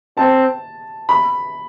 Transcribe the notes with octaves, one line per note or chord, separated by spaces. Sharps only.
C4 A5
B5